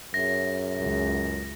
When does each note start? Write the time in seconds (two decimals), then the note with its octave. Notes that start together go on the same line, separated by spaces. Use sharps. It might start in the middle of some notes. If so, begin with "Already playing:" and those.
0.14 F#2 G#4 C#5 E5 A#6
0.79 C#2